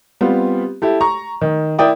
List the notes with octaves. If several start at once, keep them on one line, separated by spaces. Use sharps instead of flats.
G3 B3 C4 F4 G4
E4 G4 A4
A#5 C#6
D#3
E4 A#4 D5 G5 D#6